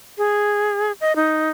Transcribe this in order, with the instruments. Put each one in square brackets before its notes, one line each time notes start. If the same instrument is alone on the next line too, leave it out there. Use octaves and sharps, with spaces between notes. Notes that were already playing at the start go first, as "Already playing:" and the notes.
[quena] G#4
D#5
D#4